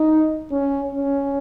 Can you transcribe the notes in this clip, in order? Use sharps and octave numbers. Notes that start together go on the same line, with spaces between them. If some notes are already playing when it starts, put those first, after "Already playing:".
Already playing: D#4
C#4
C#4